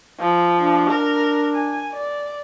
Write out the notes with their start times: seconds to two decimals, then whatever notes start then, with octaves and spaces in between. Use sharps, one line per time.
0.20 F3
0.60 D4
0.90 A#4
1.54 G#5
1.93 D5